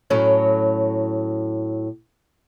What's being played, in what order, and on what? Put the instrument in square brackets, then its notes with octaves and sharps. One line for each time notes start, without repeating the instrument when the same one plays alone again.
[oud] A2 F#3 C#4